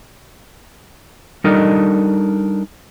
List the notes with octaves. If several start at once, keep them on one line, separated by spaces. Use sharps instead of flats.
G3 D4 D#4 A4 A#4 D#5